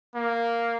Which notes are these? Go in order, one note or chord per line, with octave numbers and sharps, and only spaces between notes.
A#3